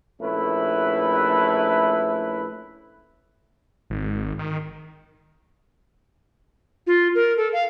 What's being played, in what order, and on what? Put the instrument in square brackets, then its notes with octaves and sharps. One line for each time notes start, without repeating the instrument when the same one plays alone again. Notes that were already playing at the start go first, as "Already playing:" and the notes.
[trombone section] A#1 A3 C#4 E4 B4
[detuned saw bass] G#1
D#3
[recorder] F4
A#4
A4
F5